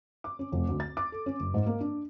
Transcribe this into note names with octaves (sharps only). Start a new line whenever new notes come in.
D6
C#4
F1
D2
A6
D6
A4
C#4
F#1
G#2
A#3
D4